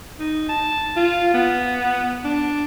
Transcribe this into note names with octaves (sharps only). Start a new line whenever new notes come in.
D#4
A5
F4
B3
D4